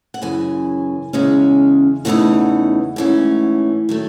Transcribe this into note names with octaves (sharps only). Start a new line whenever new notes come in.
F#5
F#2 C#3 E3 G#5
E2 C#3 G#3 C#4
E2 C#3 E3 A3 D#4 F#5
G#2 E3 A3 C#4
D#3 F#3 A3